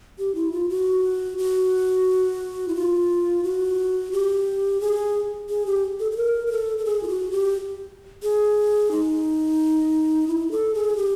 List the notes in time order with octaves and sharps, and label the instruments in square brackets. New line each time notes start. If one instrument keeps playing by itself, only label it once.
[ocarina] G4
E4
F4
F#4
F#4
E4
F4
F#4
G4
G#4
G#4
G4
A4
A4
A#4
A#4
A4
A4
G#4
F4
F#4
G4
G#4
D#4
E4
A4
G#4
G4